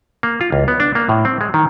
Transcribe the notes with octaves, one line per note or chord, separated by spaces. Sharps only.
A#3
F4
C#2
B3
D4
A#3
A2
C4
G#3
D#3